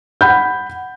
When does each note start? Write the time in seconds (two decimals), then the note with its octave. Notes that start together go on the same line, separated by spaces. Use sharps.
0.21 F#5 B5 G6